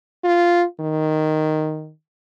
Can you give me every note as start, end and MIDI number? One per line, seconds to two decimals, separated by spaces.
0.24 0.64 65
0.80 1.91 51